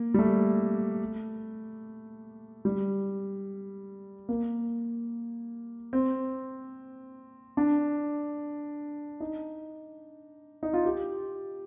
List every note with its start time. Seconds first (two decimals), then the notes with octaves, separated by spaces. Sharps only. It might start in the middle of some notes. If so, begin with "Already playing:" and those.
Already playing: A#3
0.14 G3
0.19 A3
2.65 G3
4.29 A#3
5.93 C4
7.57 D4
9.20 D#4
10.63 D#4
10.73 F4
10.85 G4